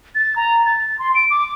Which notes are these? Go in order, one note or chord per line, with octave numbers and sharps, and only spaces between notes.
A6
A#5
A6
C6
D7
D6